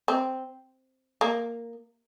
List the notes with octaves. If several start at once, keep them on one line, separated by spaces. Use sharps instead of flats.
C4
A#3